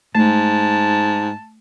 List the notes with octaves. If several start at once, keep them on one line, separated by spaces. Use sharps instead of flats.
G#2 A3 A5